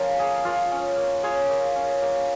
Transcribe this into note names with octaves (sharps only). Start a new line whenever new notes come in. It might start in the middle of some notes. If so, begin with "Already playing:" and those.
Already playing: F3 C#4 F4 A#4
A#3 G#4
A#3 F4
C#4
A#3
F4 G#4 C#5
A#3
C#4
A#3